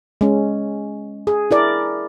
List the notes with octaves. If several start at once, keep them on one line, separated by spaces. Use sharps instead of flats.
G#3 C#4
G#4
E4 A#4 D5